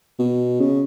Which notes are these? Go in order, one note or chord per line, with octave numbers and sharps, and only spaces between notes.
B2
C#3